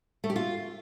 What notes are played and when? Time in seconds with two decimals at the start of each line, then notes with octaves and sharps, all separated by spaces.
0.24 A3
0.30 G4
0.36 F4